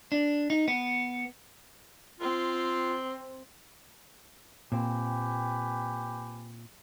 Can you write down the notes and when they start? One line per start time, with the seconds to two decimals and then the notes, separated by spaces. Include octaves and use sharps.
0.12 D4
0.50 D#4
0.68 B3
2.20 C4 F4
4.72 A#2 C4 G4 B4 G#5